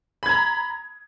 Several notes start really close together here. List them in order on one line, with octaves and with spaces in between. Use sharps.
B5 G#6 A#5